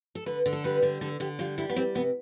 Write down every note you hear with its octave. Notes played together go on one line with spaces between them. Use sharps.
A4
D3 B4
D3
A4
G3 B4
D3
D3 A4
D3 G4
G3 F4
G3 E4
B3
G3 C4
C3 B3